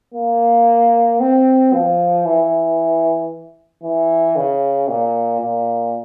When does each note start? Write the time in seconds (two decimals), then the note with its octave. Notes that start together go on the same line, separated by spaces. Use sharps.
0.14 A#3
1.20 C4
1.73 F3
2.26 E3
3.84 E3
4.36 C#3
4.88 A#2
5.41 A#2